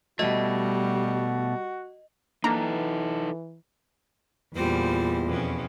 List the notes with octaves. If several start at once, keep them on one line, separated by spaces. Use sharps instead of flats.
B2 G3 A3 F#4 D#5
E3 A#3 D4 D#4 A4 A#5
E2 A#2 G3 F4 C5
F2 B2 C#4